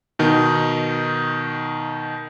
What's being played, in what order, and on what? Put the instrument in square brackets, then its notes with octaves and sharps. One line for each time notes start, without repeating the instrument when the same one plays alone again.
[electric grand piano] B2 D#3 D#4